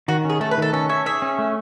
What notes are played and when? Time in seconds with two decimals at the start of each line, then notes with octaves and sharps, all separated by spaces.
0.08 D#3 F#4
0.25 C#4 G#4
0.40 A3 A4
0.51 B4
0.58 D#3 A4
0.73 C#4 A4
0.89 C#5 E5
1.06 G#4 E5
1.22 C#4
1.38 A3